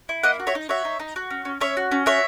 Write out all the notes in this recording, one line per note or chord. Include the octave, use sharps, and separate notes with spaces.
E4
A#3 D#5 F#5
F#4
C#5 E5
D#4
F#4 C#5 E5
D#4
D#4
F#4
C#4
C#4
C#4 C#5 E5
F#4
C#4
F#4 C#5 E5